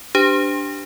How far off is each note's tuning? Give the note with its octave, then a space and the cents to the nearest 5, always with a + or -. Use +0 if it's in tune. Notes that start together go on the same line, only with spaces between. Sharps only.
D4 +0 G4 +0 C5 -45